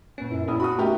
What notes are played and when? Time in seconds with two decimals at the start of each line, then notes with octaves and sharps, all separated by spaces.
0.18 A#2 B3 C#4
0.30 F#2 E4
0.48 A#1 E4 D#6
0.60 F#4 B5 D#6
0.79 A3 D#4 G4 A#4